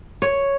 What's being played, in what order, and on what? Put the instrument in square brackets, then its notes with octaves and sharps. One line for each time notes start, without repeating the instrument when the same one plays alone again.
[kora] C#5